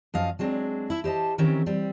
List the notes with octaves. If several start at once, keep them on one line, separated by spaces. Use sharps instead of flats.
F#2 F3 D#5 F5
F#3 G#3 C4 D4
E4 E5
G4 C5 D#5 A5
D#3 E3 C4 C#4 G4 A#4
G3 C4